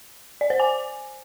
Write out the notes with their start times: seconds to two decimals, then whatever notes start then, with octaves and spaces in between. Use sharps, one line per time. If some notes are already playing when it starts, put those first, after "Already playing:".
0.41 D5
0.50 C5
0.60 G#5